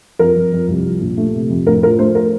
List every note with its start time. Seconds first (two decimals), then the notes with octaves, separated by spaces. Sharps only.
0.19 F2 A#4
0.36 F2
0.53 F2
0.68 C2
0.85 F3
1.02 A#2
1.17 A3
1.34 C3
1.50 F2
1.67 A2 A#4
1.83 F3 A#4
1.99 A3 C5
2.15 A#4